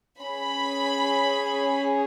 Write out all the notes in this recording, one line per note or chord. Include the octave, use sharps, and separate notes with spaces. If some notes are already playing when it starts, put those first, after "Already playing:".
C#4 G#4 B5